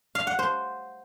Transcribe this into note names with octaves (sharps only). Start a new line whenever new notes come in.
F5
F#5
C5